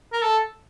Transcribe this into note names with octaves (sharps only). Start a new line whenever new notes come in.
A#4
A4